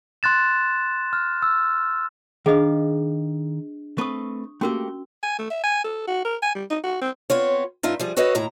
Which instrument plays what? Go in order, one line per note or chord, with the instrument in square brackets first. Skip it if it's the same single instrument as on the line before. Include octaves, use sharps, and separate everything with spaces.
[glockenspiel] C6 F#6 A6 E7
F6
E6
[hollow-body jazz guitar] D#3 F5 [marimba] D4 [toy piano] G#4 D#5
[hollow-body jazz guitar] A3 C4 B4 [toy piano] C#6 D#6
[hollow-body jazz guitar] A3 A#3 G4 [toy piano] C#4 F#4 A#4
[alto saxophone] G#5
A3
E5
G#5
A4
F#4
A#4
G#5
G3
D#4
F#4
C4
[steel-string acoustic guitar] B3 C4 F4 C#5
G2 D#4 F4 E5
F3 G3 G#4
F#4 A4 B4 C#5 D#5 F5
D#2 A2 E4 A#5